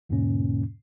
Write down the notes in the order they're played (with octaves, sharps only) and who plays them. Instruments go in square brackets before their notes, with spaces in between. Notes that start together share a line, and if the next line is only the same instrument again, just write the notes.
[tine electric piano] E2 G#2 B2 D3 A#3 C#4